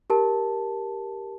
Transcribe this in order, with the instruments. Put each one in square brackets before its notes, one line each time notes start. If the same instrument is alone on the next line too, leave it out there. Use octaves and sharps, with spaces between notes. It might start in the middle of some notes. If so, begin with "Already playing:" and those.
[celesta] G4 A#4 A5